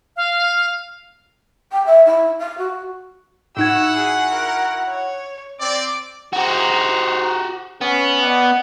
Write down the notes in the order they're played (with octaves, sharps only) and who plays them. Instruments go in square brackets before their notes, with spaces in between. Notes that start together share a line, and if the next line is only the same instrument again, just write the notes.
[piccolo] F5
[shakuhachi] G5
E5
E4
F5
F#4
[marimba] A2 D#4 G#6 [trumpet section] E4 F#4 F#5 [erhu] E6
[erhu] G#4
A#4
C#5
[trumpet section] C4 D5 [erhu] D6
[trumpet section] D#4 C5 A#5 [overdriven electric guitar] F#4 G4
[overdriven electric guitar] B3 [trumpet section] C#4
[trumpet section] D5 D#5 F#5